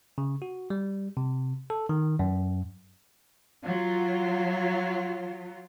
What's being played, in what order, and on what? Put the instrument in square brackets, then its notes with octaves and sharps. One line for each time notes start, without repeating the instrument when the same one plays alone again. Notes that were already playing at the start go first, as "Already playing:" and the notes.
[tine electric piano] C#3
F#4
G3
C3
A4
D#3
F#2
[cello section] F#3 F4